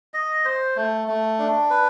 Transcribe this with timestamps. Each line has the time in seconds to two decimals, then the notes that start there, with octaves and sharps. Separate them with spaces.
0.14 D#5
0.45 C5
0.76 A3
1.08 A3
1.39 D4
1.70 B4